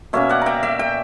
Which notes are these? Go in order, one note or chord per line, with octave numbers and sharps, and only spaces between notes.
B2 A#3 C#4 C#5 E5
D5 F#5
E5 G5 A#5
E5 G5
E5 G5